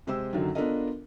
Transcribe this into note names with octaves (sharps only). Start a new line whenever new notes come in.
C3 G#3 G4 G#4 C5 E6
F#2 D3 D#3 F#3
B3 D4 F4 A4 A#4 D#5